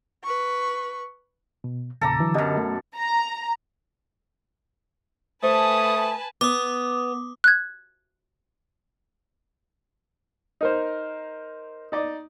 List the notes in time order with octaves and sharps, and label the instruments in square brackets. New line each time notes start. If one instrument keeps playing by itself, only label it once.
[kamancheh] B4 C#6
[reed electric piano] B2
[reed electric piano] E2 A#2 C#3 [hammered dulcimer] A4 A#5 D6
[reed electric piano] D3 E3 F#3
[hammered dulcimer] F#2 B2 [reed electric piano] D3 G4 D#5
[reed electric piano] A3
[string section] A#5
[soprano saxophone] A3 [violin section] B4 G#5 A5 [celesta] C5 [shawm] D#6
[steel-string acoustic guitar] B3 [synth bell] D6 D#6
[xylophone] F#6 G#6
[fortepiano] D#4 A#4 C5
D#4 D5 D#5